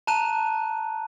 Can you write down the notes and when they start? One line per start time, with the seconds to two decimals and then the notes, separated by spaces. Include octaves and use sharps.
0.07 A5 A#5 F#6 D#7